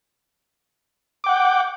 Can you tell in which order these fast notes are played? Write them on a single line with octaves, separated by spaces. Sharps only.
D6 G5 F#5